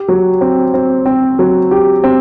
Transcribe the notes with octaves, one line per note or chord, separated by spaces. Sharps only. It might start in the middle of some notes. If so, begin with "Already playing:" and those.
Already playing: G4
F#3
C4
C4
C4
F#3
G4
C4